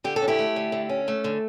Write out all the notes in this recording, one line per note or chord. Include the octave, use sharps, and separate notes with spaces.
D3 G4
A4
C#4
E4 G4
A3
D3
D3
C#4
A3
D3